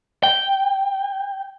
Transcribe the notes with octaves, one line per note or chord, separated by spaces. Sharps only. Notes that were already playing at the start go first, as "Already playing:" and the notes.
G5